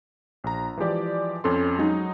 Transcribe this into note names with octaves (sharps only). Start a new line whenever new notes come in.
A#1 A#5
E3 F3 G#3 G4 D5
F2 C#4 A4 C6
F#3 G#3 D#4